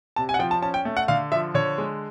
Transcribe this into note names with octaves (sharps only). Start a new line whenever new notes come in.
C3 A5
G#5
F#5
F3 G5
A5
C#4 A5
G5
A3
F#5
D3 F5
F3 E5
D3 C#5
G#3